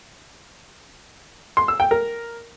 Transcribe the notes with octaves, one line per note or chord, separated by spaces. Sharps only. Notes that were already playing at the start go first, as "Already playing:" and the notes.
C6
E6
G5
A#4